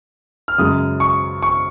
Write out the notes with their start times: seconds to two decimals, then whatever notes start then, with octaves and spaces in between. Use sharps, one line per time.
0.48 F6
0.58 F#2 C#3 G#3 D#6
1.00 C#6
1.43 C#6